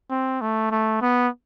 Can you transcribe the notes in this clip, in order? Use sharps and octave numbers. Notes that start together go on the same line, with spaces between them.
C4
A3
A3
B3